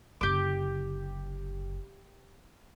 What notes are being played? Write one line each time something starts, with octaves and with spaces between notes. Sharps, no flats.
F#1 D3 G4 D6